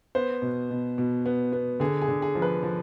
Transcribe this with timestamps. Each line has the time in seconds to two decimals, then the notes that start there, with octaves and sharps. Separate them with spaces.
0.15 B3 C5
0.42 B2
0.70 B2
0.98 B2
1.26 B3
1.52 B3
1.80 D3 G#4
2.02 G#4
2.08 D3
2.22 G#4
2.35 F3
2.42 B4
2.63 F3